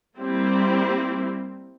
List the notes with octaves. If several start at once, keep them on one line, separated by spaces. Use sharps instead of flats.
G3 A#3 C4 E4